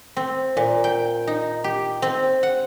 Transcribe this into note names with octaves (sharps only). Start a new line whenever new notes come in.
C4
A#2
G5
D#4
G4
C4
F#5